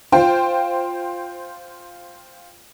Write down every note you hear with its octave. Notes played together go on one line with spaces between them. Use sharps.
F4 C5 G5